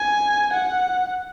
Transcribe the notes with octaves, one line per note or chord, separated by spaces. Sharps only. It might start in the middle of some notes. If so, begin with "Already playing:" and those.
Already playing: G#5
F#5